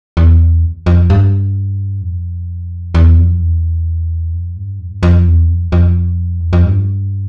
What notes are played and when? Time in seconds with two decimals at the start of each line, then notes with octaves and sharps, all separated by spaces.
0.17 E2
0.86 F2
1.10 G2
2.02 F2
2.94 E2
3.18 F2
3.41 E2
4.34 F2
4.57 G2
4.80 F2
4.91 G2
5.03 F2
5.26 E2
5.49 F2
5.72 F2
6.41 E2
6.53 F2
6.65 G2